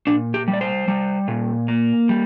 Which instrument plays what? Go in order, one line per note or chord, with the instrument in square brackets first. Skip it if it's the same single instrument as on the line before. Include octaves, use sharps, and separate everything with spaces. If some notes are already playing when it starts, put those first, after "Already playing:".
[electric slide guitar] A#2 D4
G4
G3
D5
C5
G3
A#2
A#3
G3